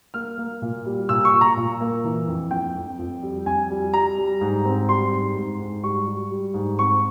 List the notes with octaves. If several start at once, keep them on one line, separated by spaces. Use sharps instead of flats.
A#3 F6
A#3
A#2
G3
A#2 E6
C#6
A#2
A#5
A#2
A#3
E3
F2
F2 G5
F2
F2
G3
F2 G#5
G3
G3 A#5
G3
G#2
C4
G3 C6
G#2
G#2
G#2
G3 C#6
G3
G3
G#2
C4 C#6